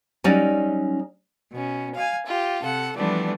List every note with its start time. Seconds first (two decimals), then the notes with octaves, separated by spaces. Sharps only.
0.24 F#3 G3 C#4 D#4 D5
1.51 B2 C#4
1.94 F5 G#5
2.25 F4 G4
2.61 C3 A4 F#5
2.94 E3 F3 G3 A3 B3 D4